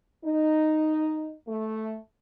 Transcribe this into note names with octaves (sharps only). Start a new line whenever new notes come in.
D#4
A3